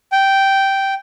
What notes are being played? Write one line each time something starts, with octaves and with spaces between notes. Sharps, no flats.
G5